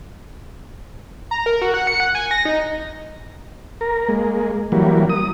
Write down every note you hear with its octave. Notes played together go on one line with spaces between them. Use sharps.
A#5
A#4
F#4
F#5
C#7
F#5
G#5
A#6
D#4
A#4
G#3 A#3
E3 F#3 G3 A#3
D#6